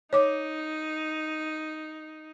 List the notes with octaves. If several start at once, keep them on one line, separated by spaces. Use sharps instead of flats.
D#4 C#5 D6